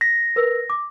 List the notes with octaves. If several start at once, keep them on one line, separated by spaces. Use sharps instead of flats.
A#6 B6
A#4 B4 E6
D6